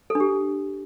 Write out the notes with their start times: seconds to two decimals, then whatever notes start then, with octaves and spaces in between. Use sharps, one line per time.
0.10 A4
0.15 D4
0.20 G4